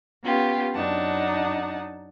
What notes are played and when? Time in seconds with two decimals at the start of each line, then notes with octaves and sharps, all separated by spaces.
0.24 B3 C#4 F4 G4
0.74 F#2 D4 D#4 F#5 A5